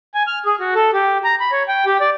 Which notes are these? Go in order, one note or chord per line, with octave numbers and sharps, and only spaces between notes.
G#5
F6
G#4
F#4
A4
G4
A#5
B5
C#5
G5
G4
D5